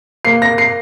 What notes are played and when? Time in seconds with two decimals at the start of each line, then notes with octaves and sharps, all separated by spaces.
0.25 A#3 C7
0.42 A#6
0.58 C7